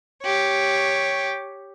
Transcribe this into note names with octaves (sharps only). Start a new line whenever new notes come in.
G4 C#5